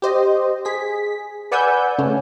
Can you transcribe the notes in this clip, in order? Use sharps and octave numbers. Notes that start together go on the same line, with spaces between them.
G4 C5 D#5
G#4 B6
B4 D5 F#5 G#5 E6 G6
C#3 A3 C#4